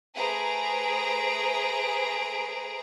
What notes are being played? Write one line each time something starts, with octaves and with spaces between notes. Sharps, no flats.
A3 G#4 B4 C5 A#5 D7